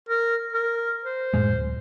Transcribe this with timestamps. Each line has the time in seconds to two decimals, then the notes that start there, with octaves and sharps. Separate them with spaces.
0.09 A#4
0.53 A#4
1.04 C5
1.34 F#2 A2 G#3
1.52 D1